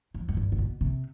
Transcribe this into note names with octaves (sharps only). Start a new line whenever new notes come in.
F2
F#2
G2
C3
B2
C3